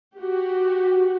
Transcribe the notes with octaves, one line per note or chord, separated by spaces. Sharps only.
F#4 G4